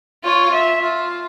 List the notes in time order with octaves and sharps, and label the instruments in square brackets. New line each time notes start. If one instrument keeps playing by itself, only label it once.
[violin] F4 [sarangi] C#5
[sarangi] E5
F4